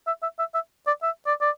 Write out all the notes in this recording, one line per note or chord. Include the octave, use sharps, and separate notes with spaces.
E5
E5
E5
E5
D5
E5
D5
D5